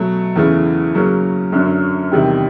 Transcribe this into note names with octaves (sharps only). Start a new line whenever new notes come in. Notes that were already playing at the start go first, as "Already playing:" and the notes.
Already playing: B2 F#3 A3
E2 C#3 E3 A3
C#3 F#3 A#3 C#4
F#2 D3 F#3 A3 C#4
E2 C3 D#3 G3